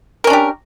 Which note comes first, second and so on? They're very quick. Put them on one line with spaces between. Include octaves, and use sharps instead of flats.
A#4 C#4 D4 G4